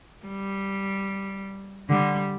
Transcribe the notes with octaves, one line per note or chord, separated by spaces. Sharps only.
G3
D3 G3